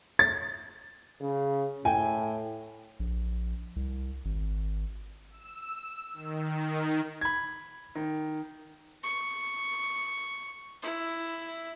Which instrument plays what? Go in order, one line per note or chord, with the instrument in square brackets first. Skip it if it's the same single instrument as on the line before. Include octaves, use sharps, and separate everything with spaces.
[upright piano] A6
[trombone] C#3
[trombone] A2 [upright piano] G5 G#5
[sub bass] A#1
C2
G#1
[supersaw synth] E6
D#3
[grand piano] B5 G#6
D#3
[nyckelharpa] C#6
E4